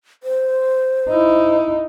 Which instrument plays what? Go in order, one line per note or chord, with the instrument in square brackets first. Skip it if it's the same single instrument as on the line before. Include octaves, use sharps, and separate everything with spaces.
[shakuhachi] C5
[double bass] D#4 E4